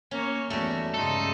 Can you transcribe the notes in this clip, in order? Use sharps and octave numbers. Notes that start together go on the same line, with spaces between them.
A#3 C#4 C#5
E2 G3 A3 F#4
G2 C#3 G#3 D#4 A4 C6